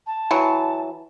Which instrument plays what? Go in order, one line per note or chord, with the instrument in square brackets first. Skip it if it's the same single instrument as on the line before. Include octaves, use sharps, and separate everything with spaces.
[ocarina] A5
[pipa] E3 F#3